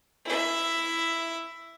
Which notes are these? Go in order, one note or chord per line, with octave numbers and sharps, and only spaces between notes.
E4 E5